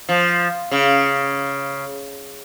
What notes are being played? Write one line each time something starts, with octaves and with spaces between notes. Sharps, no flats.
F3
C#3